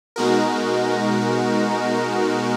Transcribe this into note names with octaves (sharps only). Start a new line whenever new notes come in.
B2 G#3 D#4 F#4 A#4